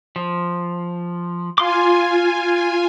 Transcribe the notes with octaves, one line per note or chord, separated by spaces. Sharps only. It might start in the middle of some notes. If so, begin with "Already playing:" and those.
F3
F4 F5 G#5 C6 D6